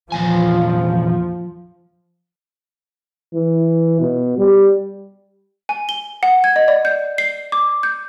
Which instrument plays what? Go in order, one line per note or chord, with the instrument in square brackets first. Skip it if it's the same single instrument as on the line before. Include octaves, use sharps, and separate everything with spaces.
[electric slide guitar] E2 A#2 G#5 [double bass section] F3
[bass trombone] E3
B2
G3
[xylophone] G#5
G7
F#5
G#6
D#5
D5
G6
C7
D6
G6